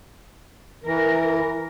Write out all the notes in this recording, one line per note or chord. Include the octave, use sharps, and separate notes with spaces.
E3 A#4